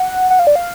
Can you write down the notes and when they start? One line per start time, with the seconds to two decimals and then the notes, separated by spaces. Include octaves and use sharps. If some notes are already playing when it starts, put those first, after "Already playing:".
Already playing: F#5
0.30 F#5
0.39 F5
0.47 D5
0.56 F5